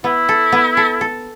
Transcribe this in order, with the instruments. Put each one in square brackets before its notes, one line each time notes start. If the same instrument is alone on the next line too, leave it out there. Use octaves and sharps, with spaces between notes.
[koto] B3 [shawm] E4
[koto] A4
B3
A4
A4